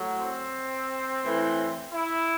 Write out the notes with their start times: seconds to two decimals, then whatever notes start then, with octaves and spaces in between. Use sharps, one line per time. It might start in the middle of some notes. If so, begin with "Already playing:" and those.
Already playing: A2 F#3
0.18 C4
1.23 A2 E3
1.92 E4